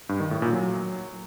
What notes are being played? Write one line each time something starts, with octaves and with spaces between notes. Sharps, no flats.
G2
D#3
A2
A#2
F#3